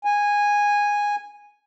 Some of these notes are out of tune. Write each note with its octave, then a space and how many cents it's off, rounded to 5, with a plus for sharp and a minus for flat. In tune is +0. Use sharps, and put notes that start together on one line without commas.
G#5 -10